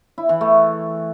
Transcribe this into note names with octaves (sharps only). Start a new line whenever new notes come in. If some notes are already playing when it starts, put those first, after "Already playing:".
E4
E3
A3